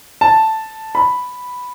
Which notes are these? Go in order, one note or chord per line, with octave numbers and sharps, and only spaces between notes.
A5
B5